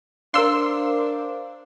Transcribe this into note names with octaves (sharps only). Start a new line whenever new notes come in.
D4 A#4 C5 F5 C6 E6